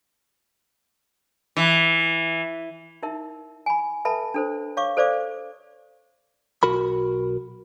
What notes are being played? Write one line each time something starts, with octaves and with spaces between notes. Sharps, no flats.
E3
D#4 E4 A#4 E5
G#5 B5
A4 B4 E5 A5 B5
D4 A4 C5
C#5 F5 C#6 D6
A4 C5 D5 F5 D6
B1 F#4 A#4 B5